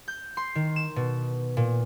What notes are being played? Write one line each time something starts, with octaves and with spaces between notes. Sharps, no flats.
G6
C6
D#3
E7
B2
A#2